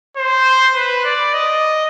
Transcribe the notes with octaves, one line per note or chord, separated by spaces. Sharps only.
C5
B4
D5
D#5